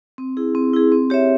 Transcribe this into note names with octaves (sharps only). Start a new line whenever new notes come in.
C4
E4 G#4
C4
E4 G#4
C4
G4 C#5 E5